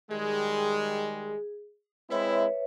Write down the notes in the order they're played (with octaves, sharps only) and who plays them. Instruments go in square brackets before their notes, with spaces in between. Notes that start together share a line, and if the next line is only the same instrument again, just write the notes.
[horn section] D#3 G3 G#3 [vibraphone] G#4
[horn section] G#3 C4 E4 [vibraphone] B4 C#5 E5